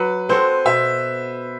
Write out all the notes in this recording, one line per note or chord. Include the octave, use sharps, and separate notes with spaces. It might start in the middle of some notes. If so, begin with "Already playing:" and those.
Already playing: F#3 B4
C4 F#4 A4 C5
B2 E5